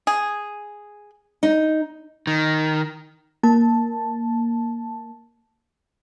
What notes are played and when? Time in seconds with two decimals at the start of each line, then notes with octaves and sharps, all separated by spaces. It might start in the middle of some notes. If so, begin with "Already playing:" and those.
0.07 G#4
1.43 D#4
2.27 D#3
3.43 A#3 A5